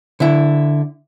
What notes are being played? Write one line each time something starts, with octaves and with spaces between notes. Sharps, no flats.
D3 E4